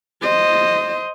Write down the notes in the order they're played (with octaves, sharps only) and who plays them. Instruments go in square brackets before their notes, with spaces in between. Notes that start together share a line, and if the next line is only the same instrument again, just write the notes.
[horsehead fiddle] C5 D#5